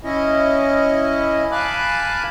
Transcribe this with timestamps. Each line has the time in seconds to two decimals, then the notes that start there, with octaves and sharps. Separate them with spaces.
0.04 C#4 E4 D#5
1.52 F5 G#5 A5 B5 D6 F#6